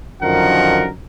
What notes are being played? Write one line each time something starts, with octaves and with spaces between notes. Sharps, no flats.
F#2 D3 D#3 F3 A#4 F#5